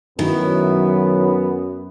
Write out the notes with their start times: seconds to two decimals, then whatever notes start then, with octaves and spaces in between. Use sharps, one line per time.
0.19 F#2 D#3 F#3 B3 E4